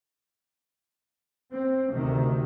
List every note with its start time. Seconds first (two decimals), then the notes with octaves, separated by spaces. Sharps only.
1.52 C4
1.91 D2 C3 D#3